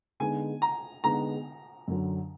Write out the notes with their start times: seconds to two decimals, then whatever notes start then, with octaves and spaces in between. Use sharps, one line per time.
0.20 D3 G#3 B3 D#4 G#5
0.62 A#5
1.04 D3 G#3 B3 D#4 A#5
1.88 F#2 D3 F#3